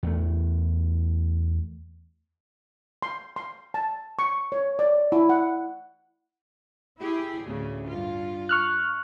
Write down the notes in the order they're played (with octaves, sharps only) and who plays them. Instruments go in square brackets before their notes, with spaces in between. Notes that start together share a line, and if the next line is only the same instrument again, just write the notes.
[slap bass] E2 A3
[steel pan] C6
C6
A5
C#6
C#5
D5
E4
F#5
[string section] E4 G4 G#4
A1 D2 C#3
G2 F4
[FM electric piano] C#6 F6 F#6